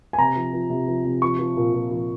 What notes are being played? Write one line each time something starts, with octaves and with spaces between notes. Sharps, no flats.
G#5
C3 A#5
F3
F3
C3
F3
C3
F3 C#6
F3
A#2
A#2
F3